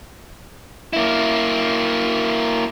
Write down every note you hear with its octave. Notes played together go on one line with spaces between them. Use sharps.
A#3 E4